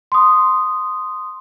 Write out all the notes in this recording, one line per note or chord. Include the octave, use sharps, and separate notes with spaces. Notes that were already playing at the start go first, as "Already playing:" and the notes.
C6 D#6